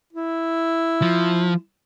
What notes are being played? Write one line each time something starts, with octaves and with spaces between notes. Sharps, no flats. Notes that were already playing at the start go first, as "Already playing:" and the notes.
E4
F3